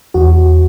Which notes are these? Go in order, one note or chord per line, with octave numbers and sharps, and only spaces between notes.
E2 F#4